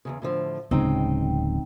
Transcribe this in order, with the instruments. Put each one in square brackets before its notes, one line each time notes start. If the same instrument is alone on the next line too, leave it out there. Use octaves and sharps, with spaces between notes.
[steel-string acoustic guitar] E2 G2 C#3
A2 D3 F3
[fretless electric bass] D1 C#3 G#3 [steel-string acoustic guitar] C4 D#4 G5